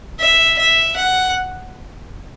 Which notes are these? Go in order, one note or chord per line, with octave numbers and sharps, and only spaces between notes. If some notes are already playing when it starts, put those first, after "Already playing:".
E5
E5
F#5